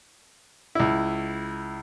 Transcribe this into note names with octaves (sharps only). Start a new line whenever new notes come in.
C#2 E4